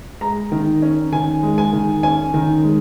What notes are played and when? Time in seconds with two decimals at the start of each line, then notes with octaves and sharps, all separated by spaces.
0.21 G#3 A#5
0.52 D#3
0.82 C#4
1.12 D#3 G#5
1.43 G#3
1.58 G#5
1.73 D#3
2.03 C#4 G#5
2.34 D#3
2.64 G#3